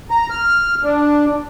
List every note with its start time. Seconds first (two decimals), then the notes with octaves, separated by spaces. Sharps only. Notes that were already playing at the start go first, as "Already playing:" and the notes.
0.10 A#5
0.30 F6
0.84 D4